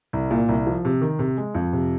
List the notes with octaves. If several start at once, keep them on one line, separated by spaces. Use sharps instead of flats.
C2
A#2
C2
F3
C3
D#3
C3
G#3
F2
C3